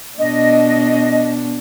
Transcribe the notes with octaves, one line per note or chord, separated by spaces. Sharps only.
B2 D4 D#5